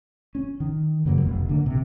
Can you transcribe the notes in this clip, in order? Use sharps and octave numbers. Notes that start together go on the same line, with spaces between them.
C#4
D#3
F#2 C#3 F#3 A#3
F1 B1
D3 A#3
A#1 C3